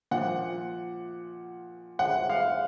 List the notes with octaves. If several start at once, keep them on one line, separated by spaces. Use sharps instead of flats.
A#2 F3 F#5
F#5
F5